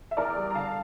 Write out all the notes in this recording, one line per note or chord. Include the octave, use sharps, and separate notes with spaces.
E5
E2 A#4 D5
G3
A#5
D3 F5 A5